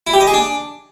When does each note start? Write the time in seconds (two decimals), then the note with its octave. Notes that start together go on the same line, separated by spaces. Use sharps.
0.07 E4
0.13 G4
0.20 D#5
0.27 G#4
0.34 D4